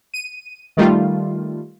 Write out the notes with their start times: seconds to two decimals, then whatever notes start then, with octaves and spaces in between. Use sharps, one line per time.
0.14 D#7
0.77 D#3 G3 A3 F4